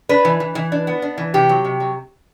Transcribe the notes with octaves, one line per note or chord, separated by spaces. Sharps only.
D4 B4
E3
E3
E3
D4
B3
D4
E3
C3 G4
F#3
C3
F#3